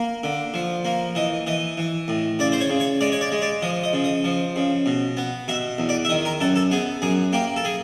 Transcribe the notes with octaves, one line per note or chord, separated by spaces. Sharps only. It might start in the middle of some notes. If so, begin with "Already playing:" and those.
Already playing: A#3
D3
F3
A#3
E3 D#5
E3 D#5
E3
A2
C#3 D5
C5
C#5
C#3
C#5
G#3 D5
C#5
D5
G#3
D5
F3 D#5
D#5
C#3
D#5
F3
C#3
B2
B3
B2 E5
E2
D5
E5
D#3 D#5
A#4
F#2 A4
A4
B3 G#4
F#2 G#4
A#3 G4
A4
G#4